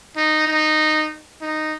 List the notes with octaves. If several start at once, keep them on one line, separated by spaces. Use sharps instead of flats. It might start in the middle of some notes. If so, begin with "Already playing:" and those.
D#4
D#4
D#4